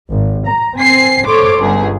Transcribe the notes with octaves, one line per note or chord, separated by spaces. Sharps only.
G#1
A#5
C4 G#5 C7
A4 C5 C#5 C6 D6
G1 C#2 G#4